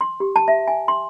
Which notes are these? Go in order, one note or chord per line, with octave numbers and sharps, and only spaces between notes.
C6
G4
A5
E5
G#5
C6